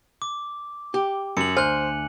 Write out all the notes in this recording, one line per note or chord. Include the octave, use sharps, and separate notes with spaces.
D6
G4
F#2 C#7 F#7
D2 C5 G#5 F6 F#6